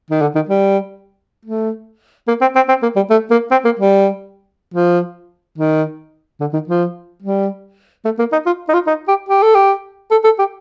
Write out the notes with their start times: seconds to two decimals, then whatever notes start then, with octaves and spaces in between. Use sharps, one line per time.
0.11 D#3
0.21 D3
0.35 D#3
0.49 G3
1.45 A3
2.28 A#3
2.41 C4
2.55 C4
2.68 C4
2.82 A#3
2.96 G3
3.10 A3
3.30 A#3
3.51 C4
3.65 A#3
3.79 G3
4.74 F3
5.58 D#3
6.40 D3
6.53 D#3
6.68 F3
7.22 G3
8.05 A3
8.19 A#3
8.32 D#4
8.46 F4
8.68 D#4
8.74 F4
8.87 D#4
9.08 G4
9.29 G4
9.42 A4
9.55 G4
10.11 A4
10.24 A4
10.39 G4